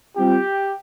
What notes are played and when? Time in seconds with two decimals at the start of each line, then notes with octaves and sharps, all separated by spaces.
0.16 G3 C4 F4 G4